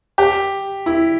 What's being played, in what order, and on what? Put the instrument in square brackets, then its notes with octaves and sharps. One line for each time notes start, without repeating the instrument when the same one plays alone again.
[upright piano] G4
E4